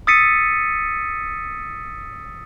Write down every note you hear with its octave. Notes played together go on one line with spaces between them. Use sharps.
D#6 E6 A6 B6 C#7 D#7